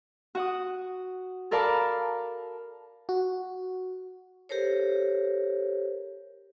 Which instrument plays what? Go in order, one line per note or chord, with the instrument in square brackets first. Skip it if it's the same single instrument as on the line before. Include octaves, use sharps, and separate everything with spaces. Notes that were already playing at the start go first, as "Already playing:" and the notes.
[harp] F#4 F#5 D#6
A4 A#4 D5 F5 A5 B5
[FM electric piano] F#4
[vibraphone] G4 A4 A#4 C5 C#5